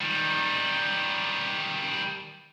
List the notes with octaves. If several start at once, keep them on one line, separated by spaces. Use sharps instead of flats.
D#3 G3